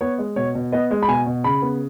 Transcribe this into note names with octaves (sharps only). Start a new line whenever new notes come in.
B3 C#5
G#3
B2 C#5
B2
B3 D#5
G#3
B5
B2 G#5
B2
C#3 B5
B3